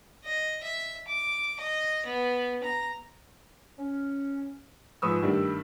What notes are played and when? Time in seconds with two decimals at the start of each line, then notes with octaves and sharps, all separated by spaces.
0.25 D#5
0.63 E5
1.07 D6
1.60 D#5
2.06 B3
2.63 A#5
3.79 C#4
5.02 G#2 F3 B4 C#6 D#6 E6
5.22 G2 D#3 G3 A3 D4